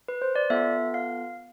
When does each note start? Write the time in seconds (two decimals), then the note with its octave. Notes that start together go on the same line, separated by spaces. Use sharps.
0.08 B4
0.22 C5
0.35 D5
0.50 B3 F4 A4 E5
0.94 F5